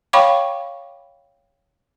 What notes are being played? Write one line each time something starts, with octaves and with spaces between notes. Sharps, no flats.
C#5 F5 G5 B5 C#6 D6